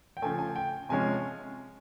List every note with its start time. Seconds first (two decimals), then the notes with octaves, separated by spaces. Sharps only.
0.17 G5
0.22 C#3 F3 A3 G#5
0.39 G#5
0.56 G5
0.89 C3 F3 G#3 C#4 G#5